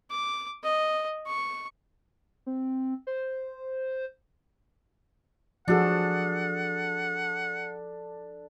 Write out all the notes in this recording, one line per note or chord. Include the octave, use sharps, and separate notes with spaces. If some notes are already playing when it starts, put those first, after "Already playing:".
D6
D#5
C#6
C4
C5
F3 D4 F#4 G#4 A4 F#5